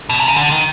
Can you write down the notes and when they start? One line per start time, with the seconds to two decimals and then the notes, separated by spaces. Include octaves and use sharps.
0.10 B2
0.19 C3
0.28 C#3
0.36 D3
0.51 D#3